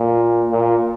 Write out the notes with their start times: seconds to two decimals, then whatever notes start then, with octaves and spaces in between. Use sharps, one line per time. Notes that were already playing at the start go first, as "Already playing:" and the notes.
Already playing: A#2
0.51 A#2